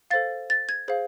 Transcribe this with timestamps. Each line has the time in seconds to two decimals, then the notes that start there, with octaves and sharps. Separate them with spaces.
0.11 A4 C5 F5 A6
0.50 A6
0.69 G#6
0.88 G#4 C5 F5